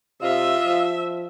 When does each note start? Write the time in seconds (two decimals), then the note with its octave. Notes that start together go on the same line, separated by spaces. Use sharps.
0.22 C3 F4 D#5 E5
0.66 F3